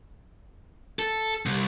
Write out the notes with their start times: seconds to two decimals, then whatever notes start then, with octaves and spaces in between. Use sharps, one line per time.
0.99 A4
1.46 C2